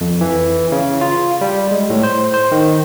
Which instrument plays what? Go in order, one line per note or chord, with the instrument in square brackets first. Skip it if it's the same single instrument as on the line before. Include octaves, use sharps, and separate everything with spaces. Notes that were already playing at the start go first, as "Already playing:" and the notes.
[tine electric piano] F2
E3
C#3
F4
G3
G#3
A2
C5
C5
D#3